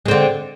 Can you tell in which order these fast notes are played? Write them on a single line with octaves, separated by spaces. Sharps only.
G#3 C4 D3